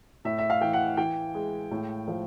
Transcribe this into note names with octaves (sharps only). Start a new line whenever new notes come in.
A2 E5
E5
F5
E3 G5
F#5
E3 G5
G#3
A2
F3